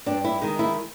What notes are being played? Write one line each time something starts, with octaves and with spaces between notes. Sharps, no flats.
G2 D4
E4
D#3 G#3 D#4
E4